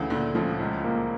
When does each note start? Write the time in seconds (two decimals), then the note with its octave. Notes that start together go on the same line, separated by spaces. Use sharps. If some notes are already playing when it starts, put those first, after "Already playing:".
Already playing: D2 C#3 E3
0.10 D2 A#2 D3
0.35 A2 C#3 F3
0.60 C#2
0.84 A#3